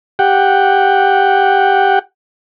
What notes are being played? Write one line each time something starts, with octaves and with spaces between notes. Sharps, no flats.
G4 F#5 G5